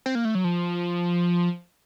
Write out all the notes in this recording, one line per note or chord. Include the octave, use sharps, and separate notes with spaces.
C4
A#3
A3
F#3
F3